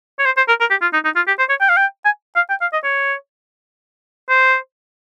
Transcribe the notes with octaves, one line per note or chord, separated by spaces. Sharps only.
C#5
C5
C5
A#4
A#4
G4
F4
D#4
D#4
F4
G4
C5
C#5
G5
F5
G5
G#5
F5
G5
F5
D#5
C#5
C5